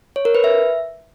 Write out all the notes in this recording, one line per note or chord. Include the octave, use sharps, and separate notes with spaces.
C#5
A#4
B4
E5